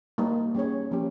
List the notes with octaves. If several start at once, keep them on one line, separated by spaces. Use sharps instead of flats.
G3 A#3 D#4
G3 C#4 G#4 C#5
F3 A#3 C#4 G4